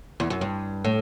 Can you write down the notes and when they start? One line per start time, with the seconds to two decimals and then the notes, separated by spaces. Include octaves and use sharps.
0.20 E2
0.30 F#2
0.41 G2
0.84 A2